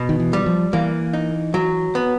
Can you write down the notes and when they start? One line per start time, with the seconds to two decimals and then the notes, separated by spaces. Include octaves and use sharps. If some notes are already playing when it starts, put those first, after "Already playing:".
Already playing: B2
0.09 D#3
0.20 E3
0.33 G3
0.46 F3
0.73 E3 A#3
1.13 D#4
1.54 F#3
1.95 B3